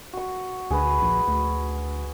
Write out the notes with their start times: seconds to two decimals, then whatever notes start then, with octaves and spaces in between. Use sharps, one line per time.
0.13 F#4 C#6
0.71 D2 G#4 B4
1.02 A#1
1.28 D2